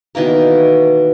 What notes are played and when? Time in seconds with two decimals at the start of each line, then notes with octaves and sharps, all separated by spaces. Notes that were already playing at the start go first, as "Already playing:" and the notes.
0.15 B2 D#3 E3 A#3